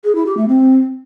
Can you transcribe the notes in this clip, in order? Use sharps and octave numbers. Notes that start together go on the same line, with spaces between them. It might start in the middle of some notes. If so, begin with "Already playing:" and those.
G#4
E4
G4
A3
C4